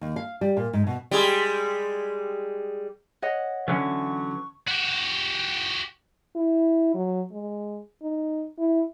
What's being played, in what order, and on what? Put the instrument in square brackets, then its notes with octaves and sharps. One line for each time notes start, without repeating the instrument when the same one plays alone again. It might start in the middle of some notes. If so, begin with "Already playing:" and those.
[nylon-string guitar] D#2
F5
G3
A#2
G#2
B2
[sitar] G3 G#3 G#4
[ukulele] C#5 D#5 F#5
[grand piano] D3 [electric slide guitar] E3 F#3 C#4 [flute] C#6
[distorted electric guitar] F#4 G4
[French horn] E4
F#3
G#3
D#4
E4